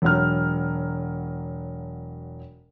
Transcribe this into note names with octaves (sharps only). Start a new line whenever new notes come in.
E1 F#3 F6